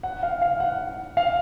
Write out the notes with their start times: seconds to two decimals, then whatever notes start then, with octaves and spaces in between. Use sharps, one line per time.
0.03 F#5
0.23 F5
0.41 F5
0.60 F#5
1.17 F5